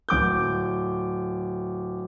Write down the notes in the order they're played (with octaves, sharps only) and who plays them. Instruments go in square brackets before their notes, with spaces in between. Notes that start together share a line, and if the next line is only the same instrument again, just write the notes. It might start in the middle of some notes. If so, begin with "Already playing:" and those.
[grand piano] D1 D6 G6